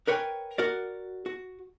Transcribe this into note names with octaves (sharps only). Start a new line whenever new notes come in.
A#4 B4 C#5 G5 G#5
F#4 A#4 D5
F#4